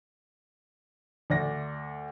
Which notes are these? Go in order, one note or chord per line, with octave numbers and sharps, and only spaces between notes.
D2 D5 A#6